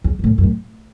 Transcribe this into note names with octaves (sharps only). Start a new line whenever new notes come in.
E2
F#2
A2
F#2
A2